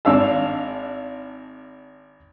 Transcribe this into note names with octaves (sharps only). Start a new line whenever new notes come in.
G#1 D4 F5 A5 E6